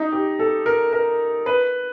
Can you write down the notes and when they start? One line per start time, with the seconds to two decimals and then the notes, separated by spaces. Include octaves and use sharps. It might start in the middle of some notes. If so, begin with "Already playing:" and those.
Already playing: D#4
0.12 G4
0.39 A4
0.66 A#4
0.93 A#4
1.46 B4